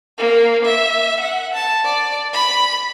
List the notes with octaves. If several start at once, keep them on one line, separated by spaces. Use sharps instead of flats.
A#3
E5
F#5
A5
D5
B5